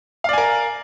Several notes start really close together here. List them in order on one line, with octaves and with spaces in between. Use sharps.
F5 D5 G#5 A#4